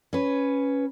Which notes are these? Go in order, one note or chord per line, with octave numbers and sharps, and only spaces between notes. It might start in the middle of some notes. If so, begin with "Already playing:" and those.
C#4 B4